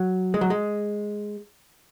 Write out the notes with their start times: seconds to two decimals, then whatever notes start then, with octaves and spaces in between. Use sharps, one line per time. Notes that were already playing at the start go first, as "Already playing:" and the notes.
Already playing: F#3
0.34 G#3
0.41 F#3
0.50 G#3